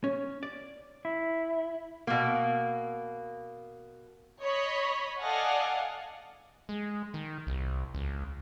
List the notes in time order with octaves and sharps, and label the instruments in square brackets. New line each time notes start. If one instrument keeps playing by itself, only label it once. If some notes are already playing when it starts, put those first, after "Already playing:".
[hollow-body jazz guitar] C#4
D5
[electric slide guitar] E4
[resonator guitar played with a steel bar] B2 A#3
[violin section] C#5 D#5 B5
A4 D5 D#5 F5 F#5 G#5
[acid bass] G#3
D#3
C2
C#2